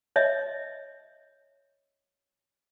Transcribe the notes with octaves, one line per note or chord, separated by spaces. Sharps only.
C#5 D#5 E5